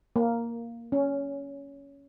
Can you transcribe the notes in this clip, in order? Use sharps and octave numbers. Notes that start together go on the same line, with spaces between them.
A#3
C#4